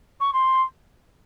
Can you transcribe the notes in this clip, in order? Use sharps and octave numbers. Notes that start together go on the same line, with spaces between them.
C#6
C6